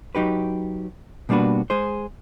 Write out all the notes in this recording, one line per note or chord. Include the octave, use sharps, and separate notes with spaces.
F#3 D#4 G4 B4
B2 G3 A#3 D4 F#4 B4
G#3 G#4 C5